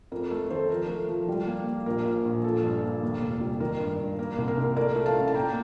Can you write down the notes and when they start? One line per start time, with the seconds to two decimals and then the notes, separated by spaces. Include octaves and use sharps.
0.12 F2 A#4
0.31 A3 A4
0.50 D#3 A4 C5
0.70 F3 A#4
0.89 A3
1.09 F3
1.28 G3
1.47 A#3
1.67 A#3
1.86 A#1 A#4
2.06 A#1
2.25 A#1
2.44 F3 A4
2.63 G2
2.84 A#3
3.03 D#2
3.21 F1
3.41 G3
3.60 D#3 A#4
3.80 G2
4.00 G2
4.19 A#3 A#4
4.38 C2
4.48 A#4
4.57 C2
4.77 A3 A#4 D5
4.96 A3
5.06 F5 A5
5.15 A1
5.28 A5
5.34 A#3 G5 A#5